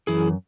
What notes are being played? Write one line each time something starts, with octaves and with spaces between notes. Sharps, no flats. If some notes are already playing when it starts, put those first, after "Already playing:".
F#2 E3 E4 G#4